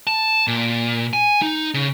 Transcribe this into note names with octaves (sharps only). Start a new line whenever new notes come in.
A5
A#2
G#5
D#4
C#3